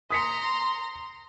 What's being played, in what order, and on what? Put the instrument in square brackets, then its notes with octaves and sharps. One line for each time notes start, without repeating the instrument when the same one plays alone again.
[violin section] A#5 C6 [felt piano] D#6 B6 C#7